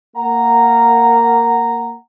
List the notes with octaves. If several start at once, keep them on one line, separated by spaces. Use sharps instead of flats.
A#3 F#5 A#5